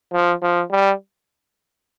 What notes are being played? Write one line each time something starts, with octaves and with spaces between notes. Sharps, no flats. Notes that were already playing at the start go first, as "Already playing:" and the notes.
F3
F3
G3